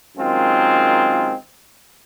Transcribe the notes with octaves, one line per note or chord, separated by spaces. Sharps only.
F#2 D#3 G#3 C4 F4